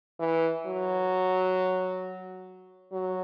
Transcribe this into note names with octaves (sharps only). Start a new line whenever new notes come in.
E3
F#3
F#3